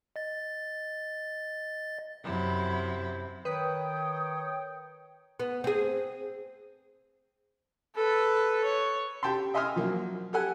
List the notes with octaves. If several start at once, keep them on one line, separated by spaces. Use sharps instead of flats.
D#5 A6
F#2 C3 E4
D#3 B4 C#5 G5 D#6
B3
C4 G#4
A4 B4
C#5
G4 G5 A5 C6
D#5 E5 G#5 C6 D#6 F6
F3 F#3 A#3
G4 A4 F#5 G#5 F#6